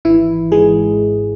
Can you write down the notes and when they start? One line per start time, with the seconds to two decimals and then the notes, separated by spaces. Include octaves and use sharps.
0.05 G#1 E3 E4
0.51 G#2 E3 G#3 G#4